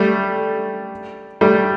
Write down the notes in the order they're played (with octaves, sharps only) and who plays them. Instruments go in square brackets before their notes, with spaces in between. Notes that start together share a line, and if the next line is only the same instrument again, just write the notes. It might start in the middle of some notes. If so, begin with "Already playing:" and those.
Already playing: [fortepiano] G3 A3
G3 A3